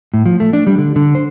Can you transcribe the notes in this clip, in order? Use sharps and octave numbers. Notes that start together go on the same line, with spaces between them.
A2
F3
A3
D4
G3
D3
D3
C5